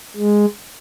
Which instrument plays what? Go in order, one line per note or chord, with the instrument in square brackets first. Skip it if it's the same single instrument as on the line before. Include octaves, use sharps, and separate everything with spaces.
[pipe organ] G#3